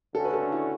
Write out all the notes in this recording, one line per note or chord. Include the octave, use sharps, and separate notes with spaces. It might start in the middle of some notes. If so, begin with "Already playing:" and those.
D3 A3 C#4 F#4 A4
B4
A4
D4
E4